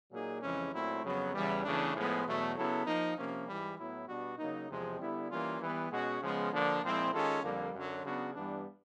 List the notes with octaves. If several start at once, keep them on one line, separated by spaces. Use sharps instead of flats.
A#2 F#3 A#3 D#4 G#4
F2 C#3 E3 G#3 C#4
A#2 F#3 A3 C4 E4
F2 C#3 F#3 B3
E2 C#3 E3 G3
E2 C#3 E3 A3 D4
A2 F3 G#3 B3
E2 B2 F#3 A3
C#3 F#3 B3 E4 A4
F3 A#3 D#4
C3 F3 A#3 C#4
G#2 E3 G3
A2 F#3 B3 E4
B2 G3 B3 D4 F#4
C#3 F#3 A#3 D#4
E2 C3 F3 G#3 C4
D3 G3 B3 E4
E3 G3 A#3 C#4 F4
E3 G3 B3
B2 G#3 C#4 F#4
C#3 F3 G#3 B3
D3 F3 A#3 D4
A#2 F3 G#3 C4 E4
D#3 G#3 C#4 F4 A4
F2 D3 G3 A#3
F#2 D3 F#3
C#3 F#3 B3 D4 F#4
G2 E3 G3 B3 D4